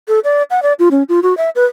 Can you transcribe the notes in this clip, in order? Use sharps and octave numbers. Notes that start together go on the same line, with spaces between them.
A4
D5
F#5
D5
F4
C#4
F4
F#4
E5
B4